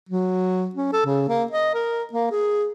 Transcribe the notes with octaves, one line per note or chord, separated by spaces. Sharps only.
F#3
C#4
A4
C#3
A#3
D#5
A#4
A#3
G#4